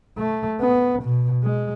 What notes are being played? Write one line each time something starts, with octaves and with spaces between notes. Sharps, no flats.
A3
B3
B2
G#3